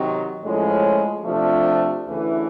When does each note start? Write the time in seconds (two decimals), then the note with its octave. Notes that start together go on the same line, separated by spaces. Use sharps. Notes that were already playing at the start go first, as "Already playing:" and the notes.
Already playing: C3 D#3 F#3
0.43 A2 F3 G#3 C#4
1.24 C3 F3 A3 D4
2.05 D2 C#3 E3 A3